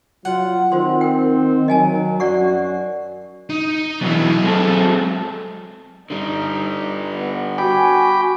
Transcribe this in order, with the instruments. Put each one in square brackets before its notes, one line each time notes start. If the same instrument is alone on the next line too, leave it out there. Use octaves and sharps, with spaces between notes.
[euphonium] F#3 [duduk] F4 [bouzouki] F#5
[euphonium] D#3 [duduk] C4 [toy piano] F4 C5 C6
[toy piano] A#4 G5
[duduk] F#3 [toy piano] D#5 G#5 A5
[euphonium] F#2 [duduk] F#4 [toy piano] D5 F#5 C#6
[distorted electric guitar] D#4
[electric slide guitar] B2 E3 [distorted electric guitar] F#3 D#5
[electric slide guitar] G#3 C4 A4
[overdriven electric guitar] D3 G3 [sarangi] D#4
[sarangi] B3
[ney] F#4 [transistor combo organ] G5 B5 D6 [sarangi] G#5